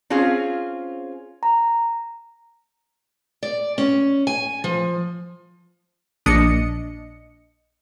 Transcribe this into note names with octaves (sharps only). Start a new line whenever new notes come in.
C4 C#4 F4 G#4
A#5
D5
C#4
G#5
F3
A#1 D4 D#5 C#7